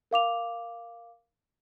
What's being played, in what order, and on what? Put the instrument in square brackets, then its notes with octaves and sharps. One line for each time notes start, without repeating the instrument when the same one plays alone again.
[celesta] A#4 F5 D6 F7